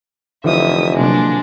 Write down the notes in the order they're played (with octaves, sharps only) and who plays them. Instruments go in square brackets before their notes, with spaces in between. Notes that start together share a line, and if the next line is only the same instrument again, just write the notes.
[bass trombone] F1 [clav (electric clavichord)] D3 E3 F3 [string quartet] E5 D#6
[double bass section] C3 F#3 A#3 [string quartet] G#3 D4